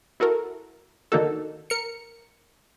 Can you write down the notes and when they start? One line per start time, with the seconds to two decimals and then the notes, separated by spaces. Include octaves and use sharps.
0.20 E4 F#4 A4 A#4
1.12 D3 D#3 A#3 D#4 F#4 A4
1.70 A#4 C#7